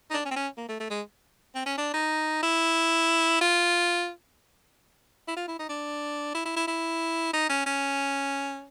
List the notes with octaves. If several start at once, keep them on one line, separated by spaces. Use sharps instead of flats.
D#4
D4
C#4
C4
C#4
A#3
A3
A3
G#3
C4
C#4
D4
D#4
E4
F4
E4
F4
E4
D#4
D4
E4
E4
E4
E4
D#4
C#4
C#4